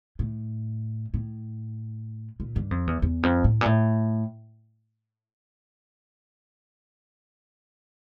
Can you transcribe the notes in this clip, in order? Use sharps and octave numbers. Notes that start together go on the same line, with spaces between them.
A2
A2
A#2
G2
F2
E2
E2
F2
A2
A#2
A2